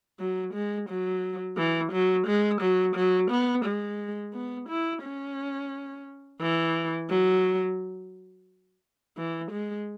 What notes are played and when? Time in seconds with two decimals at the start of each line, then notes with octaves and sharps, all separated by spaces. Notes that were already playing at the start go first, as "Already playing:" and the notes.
0.19 F#3
0.53 G#3
0.89 F#3
1.57 E3
1.92 F#3
2.27 G#3
2.61 F#3
2.95 F#3
3.30 B3
3.65 G#3
4.33 B3
4.69 E4
5.03 C#4
6.40 E3
7.10 F#3
9.17 E3
9.51 G#3